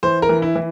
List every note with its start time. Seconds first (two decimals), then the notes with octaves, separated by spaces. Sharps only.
0.03 E3 C5
0.22 A#4
0.29 E3
0.42 E4
0.56 E3